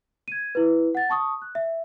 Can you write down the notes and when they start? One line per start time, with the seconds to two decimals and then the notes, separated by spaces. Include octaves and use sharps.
0.28 G#6 D#7
0.55 E4 B4
0.95 F#5 A6
1.10 A5 C#6 D#6
1.42 F#6
1.55 E5